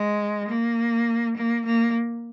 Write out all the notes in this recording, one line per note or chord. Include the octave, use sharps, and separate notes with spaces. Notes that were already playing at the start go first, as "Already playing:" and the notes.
Already playing: G#3
A#3
A#3
A#3